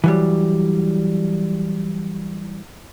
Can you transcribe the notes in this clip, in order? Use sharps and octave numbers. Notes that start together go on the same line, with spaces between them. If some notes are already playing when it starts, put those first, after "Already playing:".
E3 F#3 G3